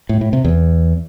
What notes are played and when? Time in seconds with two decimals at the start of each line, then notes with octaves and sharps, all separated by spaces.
0.09 A2
0.21 A2
0.33 C3
0.45 E2